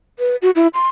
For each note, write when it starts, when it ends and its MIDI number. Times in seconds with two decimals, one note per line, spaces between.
0.19 0.36 71
0.42 0.51 66
0.56 0.68 64
0.74 0.89 84